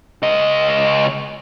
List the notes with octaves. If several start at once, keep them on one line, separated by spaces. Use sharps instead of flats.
C#2 D#5